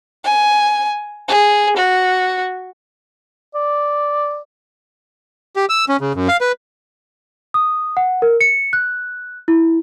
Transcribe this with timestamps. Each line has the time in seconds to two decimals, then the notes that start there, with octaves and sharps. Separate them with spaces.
0.24 G#5
1.28 G#4
1.76 F#4
3.55 D5
5.56 G4
5.69 E6
5.89 C#4
6.01 C#3
6.15 F#2
6.28 F5
6.41 B4
7.54 D#6
7.97 F#5
8.22 A#4
8.41 C#7
8.73 F#6
9.48 E4